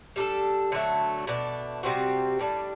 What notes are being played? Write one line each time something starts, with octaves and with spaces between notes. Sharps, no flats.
G3 D4 A4
D3 F#3 A3
B2 A3 D4
C3 G3 C4 F#4
A2 G3 D4